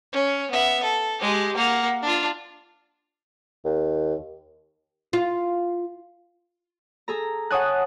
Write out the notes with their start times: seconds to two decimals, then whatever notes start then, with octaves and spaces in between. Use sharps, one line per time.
0.13 C#4
0.51 B3 E5
0.84 A4
1.21 G#3 G4
1.56 A#3 F#5
2.02 D4 F4
3.64 D#2
5.13 F4
7.08 G#4 A4 A#5
7.51 C#5 F#5 G#5 A5 D#6 F#6